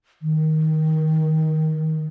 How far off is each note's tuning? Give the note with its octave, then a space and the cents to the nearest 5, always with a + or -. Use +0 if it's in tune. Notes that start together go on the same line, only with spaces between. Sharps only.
D#3 +5